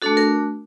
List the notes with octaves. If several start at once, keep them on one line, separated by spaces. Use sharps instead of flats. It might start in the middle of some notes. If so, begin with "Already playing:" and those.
A3 D4 F#4 A4
A#4